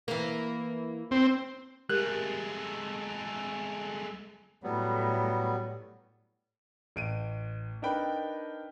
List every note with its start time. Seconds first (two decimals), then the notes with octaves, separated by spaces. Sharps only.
0.08 E3 A#3
1.11 C4
1.90 G#3 A3 G4 A#4 F#6
4.63 A2 F#3 G3 B3
6.96 A1 D7 D#7
7.82 D4 D#4 A#4 B4 G5 B5